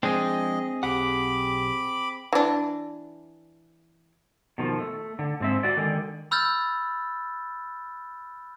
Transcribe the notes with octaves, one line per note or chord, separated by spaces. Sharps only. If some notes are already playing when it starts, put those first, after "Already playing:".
F3 G#3 C4 D4 G#4 D#5
B1 G4 F#5 B5 D6
E3 D4
B2 D#3 F3
A3
D3
G#2 C4 E5
F#4 D5
D3 D#3 G#3
B5 E6 F6 G6 A6